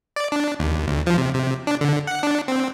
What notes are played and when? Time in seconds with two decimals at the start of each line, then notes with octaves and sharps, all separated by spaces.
0.16 D5
0.32 D4
0.59 D#2
0.87 D2
1.07 F3
1.18 C3
1.35 C3
1.67 D4
1.81 D3
2.07 F#5
2.23 D4
2.48 C4